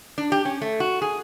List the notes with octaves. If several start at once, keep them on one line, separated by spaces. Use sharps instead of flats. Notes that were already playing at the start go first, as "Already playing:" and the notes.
D4
G4
C#4
A3
F#4
G#4